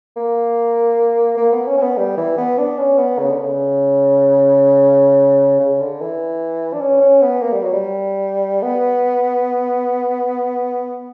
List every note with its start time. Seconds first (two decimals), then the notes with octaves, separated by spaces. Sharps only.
0.17 A#3
1.37 A#3
1.53 B3
1.67 C#4
1.78 C#4
1.82 B3
1.98 G3
2.18 E3
2.38 B3
2.59 D4
2.78 C#4
2.98 B3
3.19 C#3
3.30 D3
3.41 C#3
5.60 C#3
5.80 D3
6.01 E3
6.74 D4
6.81 C#4
7.01 C#4
7.22 B3
7.42 A#3
7.53 G3
7.63 F#3
7.73 G3
8.63 B3